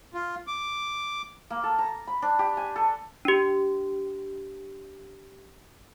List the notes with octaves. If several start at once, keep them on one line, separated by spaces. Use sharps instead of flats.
F4
D6
A#3
A4
A#5
B5
D4
G4
G#5
A4
D4 G4